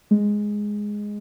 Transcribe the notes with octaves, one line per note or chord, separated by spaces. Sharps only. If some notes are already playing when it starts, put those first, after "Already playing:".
G#3